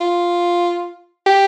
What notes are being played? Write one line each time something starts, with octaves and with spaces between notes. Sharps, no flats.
F4
G4